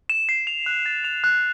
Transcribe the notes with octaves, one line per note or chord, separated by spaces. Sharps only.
E7
C7
F7
F#6
A6
F7
F#6